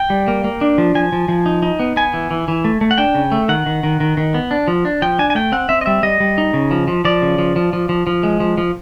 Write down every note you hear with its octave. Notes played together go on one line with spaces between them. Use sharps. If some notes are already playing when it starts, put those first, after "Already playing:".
Already playing: G5
G3
A#3
A#3
D4
F3
F3 G#5
F3
F3
D#4
D#4
B3
B3 G#5
E3
E3
E3
A3
A3
F#5
D4 G5
C#3
A3
D#3 F#5
D#3
D#3
D#3
D#3
B3
D4
F3
D4
F3 G5
D4 G#5
G#5
A3 G5
C4 F#5
C4 E5
D#5
G3 E5
G3 D#5
G3
D#4
C#3
F3
F3
F3 D5
C#3
F3
F3
F3
F3
F3
G#3
F3
F3